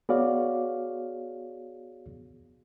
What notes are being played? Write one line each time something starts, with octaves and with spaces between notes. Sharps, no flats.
B3 F#4 G#4 C#5 D5 F5